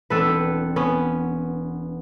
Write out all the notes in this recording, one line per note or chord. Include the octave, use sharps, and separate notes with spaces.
E1 C4 D4 A4 B4
B3 C#4